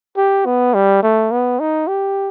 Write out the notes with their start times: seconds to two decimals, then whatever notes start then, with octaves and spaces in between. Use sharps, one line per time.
0.17 G4
0.46 B3
0.74 G3
1.03 A3
1.32 B3
1.60 D#4
1.88 G4